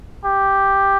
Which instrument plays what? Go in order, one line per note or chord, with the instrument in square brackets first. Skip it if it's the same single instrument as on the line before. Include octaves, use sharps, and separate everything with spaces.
[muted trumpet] G4